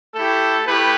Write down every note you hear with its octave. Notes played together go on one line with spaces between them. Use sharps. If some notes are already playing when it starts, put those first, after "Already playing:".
A3 E4 G4 A4
A3 E4 G4 B4